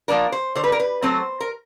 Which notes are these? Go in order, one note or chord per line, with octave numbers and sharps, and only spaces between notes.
F3 A#3 D4 A#4
C5
D3 C5
B4
A#4
B4
F#3 A3 C4 C5
A#4